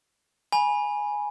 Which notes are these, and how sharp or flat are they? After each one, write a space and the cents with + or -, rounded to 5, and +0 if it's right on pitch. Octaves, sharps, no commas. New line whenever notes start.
G#5 +0 B5 -20